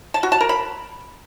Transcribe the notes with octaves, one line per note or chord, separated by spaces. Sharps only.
A5
F#4
A5
A#4
B5